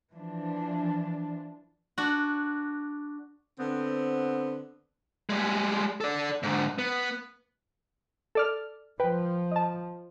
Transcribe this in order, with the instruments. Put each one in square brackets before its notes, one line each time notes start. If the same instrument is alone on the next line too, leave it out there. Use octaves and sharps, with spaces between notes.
[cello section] E3 F3 D4
[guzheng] D4 F#4
[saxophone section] D3 B3 C4
[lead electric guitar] G3 G#3
A4 D5
G#2 D3
B3
[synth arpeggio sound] A4 D5 F6
[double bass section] F3 [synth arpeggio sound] B4 G5
[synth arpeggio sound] D#5 A5